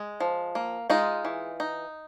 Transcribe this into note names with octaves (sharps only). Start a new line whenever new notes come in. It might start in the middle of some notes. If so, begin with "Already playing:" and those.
Already playing: G#3
F3
A#3
G#3 D#4 F4
E3
D#4